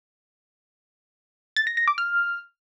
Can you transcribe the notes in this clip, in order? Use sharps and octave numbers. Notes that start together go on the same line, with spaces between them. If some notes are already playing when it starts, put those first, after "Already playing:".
A6
A#6
A#6
D6
F6